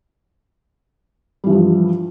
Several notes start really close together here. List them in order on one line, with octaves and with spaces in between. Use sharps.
G3 E3 G2 F3